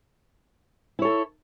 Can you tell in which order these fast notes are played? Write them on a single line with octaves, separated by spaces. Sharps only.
E4 C#5 A4